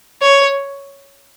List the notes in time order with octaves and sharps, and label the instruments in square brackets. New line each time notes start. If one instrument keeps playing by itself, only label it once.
[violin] C#5